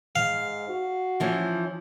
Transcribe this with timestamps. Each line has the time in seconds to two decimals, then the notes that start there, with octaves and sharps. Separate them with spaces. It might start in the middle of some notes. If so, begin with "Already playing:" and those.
0.16 G#2 F5
0.69 F#4
1.20 E3 F3 C#4